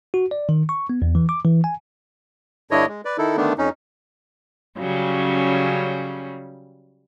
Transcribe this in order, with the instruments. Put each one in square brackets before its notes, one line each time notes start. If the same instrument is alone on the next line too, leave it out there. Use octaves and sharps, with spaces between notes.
[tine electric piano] F#4
D5
D#3
C#6
B3
E2
E3
D6
E3
G#5
[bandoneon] G2 D3 D4 E4 C#5 D#5
G#3
B4 D5
D#3 D#4 E4 A4
D3 D#3 A3 B3 D4
F2 C#4 D#4
[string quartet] C#3 F#3 G3 C#4